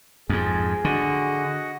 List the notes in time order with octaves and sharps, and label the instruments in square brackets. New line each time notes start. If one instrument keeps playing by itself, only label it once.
[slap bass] F2 G#2 [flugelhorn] G#4
[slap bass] D3 [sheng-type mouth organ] F#4 D#5